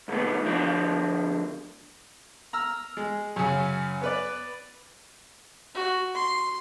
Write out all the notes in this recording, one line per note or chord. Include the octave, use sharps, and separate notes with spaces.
C2 G#2 D#3 A3 B3
D2 D3 F3 F#4 D5
A#5 E6 F6
G#3
F#2 C#3
B3 B4 D5
F#4
C6